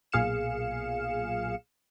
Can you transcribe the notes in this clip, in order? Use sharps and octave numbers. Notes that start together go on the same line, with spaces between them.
B1 A#2 G#4 F5 C#7 E7